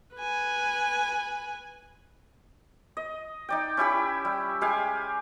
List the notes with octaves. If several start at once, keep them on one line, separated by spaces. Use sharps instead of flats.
B4 G#5
D#5
D#4 D5 G5
C#4 E4 G4 B5
G3
G#3 G4 F5 G#5